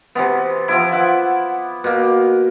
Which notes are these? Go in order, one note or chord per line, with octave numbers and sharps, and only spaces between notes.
C3 E3 B3
F3 B3 E4
E5 F#5 D6
B2 A#3